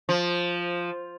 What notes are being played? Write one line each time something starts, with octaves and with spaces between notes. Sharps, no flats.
F3